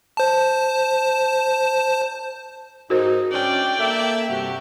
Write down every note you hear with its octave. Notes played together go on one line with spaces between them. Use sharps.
C5 A5
G#2 D#4 F#4 A#4 C5
C#4 D4 D5 G5
A#3 A4 E5
G2 C3 F#4 G4